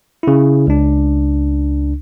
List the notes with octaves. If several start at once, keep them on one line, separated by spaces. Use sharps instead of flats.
C#3 E4
C#2 D4